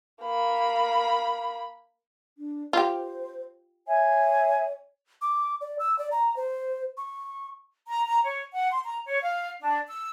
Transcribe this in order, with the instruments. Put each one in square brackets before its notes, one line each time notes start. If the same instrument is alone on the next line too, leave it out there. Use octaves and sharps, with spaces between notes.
[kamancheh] A#3 B5
[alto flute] D4
[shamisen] F4 G4 [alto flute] C5
[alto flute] C#5 [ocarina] E5 [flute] G#5
[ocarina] D6
D5
E6
D5
A#5
C5
C#6
[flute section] A#5
A#5
C#5
F#5
C6
A#5
C#5
F5
D4
E6